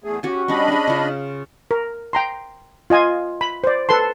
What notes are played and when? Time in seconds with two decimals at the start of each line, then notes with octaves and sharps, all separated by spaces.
0.04 E2 A3 G#4
0.23 C#4 F#4 G4 G#5
0.48 G3 C#4 D4 D#5 B5
0.68 C#4 G#4
0.87 C#3 F4
1.71 A#4
2.13 G5 A#5 C6
2.90 F4 D#5 G#5 D#6
3.41 B5
3.64 C5 D5
3.89 A4 B4 A5 C6